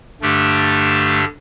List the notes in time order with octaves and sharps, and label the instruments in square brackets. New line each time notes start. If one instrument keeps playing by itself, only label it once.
[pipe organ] G2 D3 A3 D4 G4